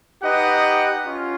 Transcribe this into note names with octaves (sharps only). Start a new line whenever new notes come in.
D#4 G4 B4 D#5 F#5
C#4 F4